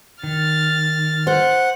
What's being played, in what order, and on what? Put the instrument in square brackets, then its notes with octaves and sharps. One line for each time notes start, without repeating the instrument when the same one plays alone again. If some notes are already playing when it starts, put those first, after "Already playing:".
[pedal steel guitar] D#3 [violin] F6 A6
[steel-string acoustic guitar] C5 [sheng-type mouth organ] F#5